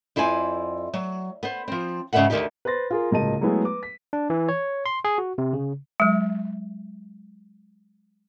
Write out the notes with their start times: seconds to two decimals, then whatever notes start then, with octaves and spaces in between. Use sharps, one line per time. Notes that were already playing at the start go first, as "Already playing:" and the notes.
0.16 F2 E4 C5 D5 G#5
0.94 F#3
1.43 B3 C5
1.68 F3 C4
2.13 G#2 C#3 G3 B4 E5 F#5
2.30 D2 G2 D#3 D#4 G4
2.65 B4 C5 C6 A6 A#6
2.91 F4 G#4 A#4
3.11 D1 C#2 A#3 D#5 A5 D#7
3.41 F#3 G#3 A3 B3 E4 G#4
3.64 B4 D6
3.83 B6
4.13 D4
4.30 E3
4.49 C#5
4.86 C6
5.05 G#4
5.18 F#4
5.38 C3
5.53 C#3
6.00 F#3 G#3